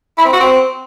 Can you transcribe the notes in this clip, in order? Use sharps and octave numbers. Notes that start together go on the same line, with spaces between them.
E4
C4
F#4
C4